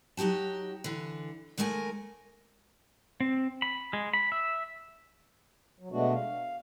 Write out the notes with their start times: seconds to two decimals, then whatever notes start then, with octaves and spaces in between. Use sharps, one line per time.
0.17 F#3 D#4 F#4 G4 A5
0.84 D3 E3
1.58 D#2 G#3 A3 A#4 D#5 G#5
3.21 C4
3.62 B5
3.93 G#3
4.14 B5
4.32 E5
5.78 F#3
5.92 B2 G#3 A3 B3 D4 F#4
6.14 F5